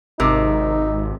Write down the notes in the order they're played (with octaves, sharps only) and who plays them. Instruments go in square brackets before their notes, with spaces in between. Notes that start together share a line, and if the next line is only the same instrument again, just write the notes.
[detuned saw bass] G#1 [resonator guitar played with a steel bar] C3 A#4 [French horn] D#4